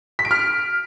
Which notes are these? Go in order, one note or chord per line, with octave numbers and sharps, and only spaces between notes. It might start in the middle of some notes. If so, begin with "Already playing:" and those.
B6
D7
F6